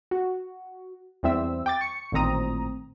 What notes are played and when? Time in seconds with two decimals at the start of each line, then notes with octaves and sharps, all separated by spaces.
0.11 F#4
1.23 E2 G3 C4 E5 E6
1.66 G5 D6 A6
1.81 C#6 C#7
2.12 A1 A#2 D#3 C4 A#5 D#6